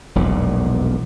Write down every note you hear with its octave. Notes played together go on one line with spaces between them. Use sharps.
E1 B1 F2 A#2